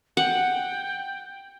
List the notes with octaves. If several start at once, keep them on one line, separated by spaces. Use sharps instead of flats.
F#5 G5